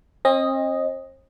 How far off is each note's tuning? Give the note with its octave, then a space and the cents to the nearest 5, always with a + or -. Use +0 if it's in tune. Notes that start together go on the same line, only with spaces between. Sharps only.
C4 +40 D#5 +0